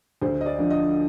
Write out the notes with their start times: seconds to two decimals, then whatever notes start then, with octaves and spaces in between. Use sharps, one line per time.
0.22 D2 C5
0.41 D#5
0.46 D5
0.58 D3 F3
0.70 D#5